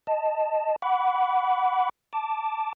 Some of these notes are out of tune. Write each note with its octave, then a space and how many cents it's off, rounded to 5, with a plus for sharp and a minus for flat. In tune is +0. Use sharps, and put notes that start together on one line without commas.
D#5 +0 A5 +0
F#5 +0 B5 +0 D6 -45
A5 +0 D6 +0